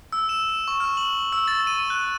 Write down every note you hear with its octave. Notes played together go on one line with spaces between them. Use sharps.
E6
E7
E7
C#6
F6
F#7
E6
A6
D#7
F#6